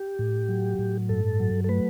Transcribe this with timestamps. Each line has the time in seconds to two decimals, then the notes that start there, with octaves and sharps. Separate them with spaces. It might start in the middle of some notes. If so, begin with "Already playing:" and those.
Already playing: G4
0.19 A2
0.49 F#3
0.79 A2
1.09 G2 A4
1.40 F#3
1.64 A4
1.69 A3 B4